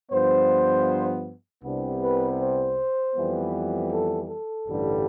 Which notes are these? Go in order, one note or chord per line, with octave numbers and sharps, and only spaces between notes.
G2 F3 B3 C5
C2 C3 G3 B3 D4
B4
C5
F2 E3 G3 B3
A4
A4
A1 G2 D3 G3